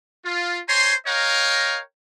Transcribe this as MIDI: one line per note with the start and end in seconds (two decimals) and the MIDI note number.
0.25 0.58 65
0.67 0.93 72
0.67 0.93 73
0.67 0.93 80
0.67 0.93 82
0.67 0.93 84
1.06 1.79 70
1.06 1.79 73
1.06 1.79 75
1.06 1.79 77
1.06 1.79 79
1.06 1.79 82